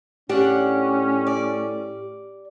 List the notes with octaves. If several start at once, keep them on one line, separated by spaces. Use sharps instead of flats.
A2 C#4 D4 G4 F#5
D5